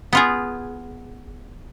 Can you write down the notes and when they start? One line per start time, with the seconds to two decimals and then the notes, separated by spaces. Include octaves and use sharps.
0.13 B3 F4 G#4